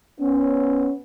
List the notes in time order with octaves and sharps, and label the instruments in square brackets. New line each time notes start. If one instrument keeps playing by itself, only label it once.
[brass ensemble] B3 C#4